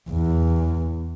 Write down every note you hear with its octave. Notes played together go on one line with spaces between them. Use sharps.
E2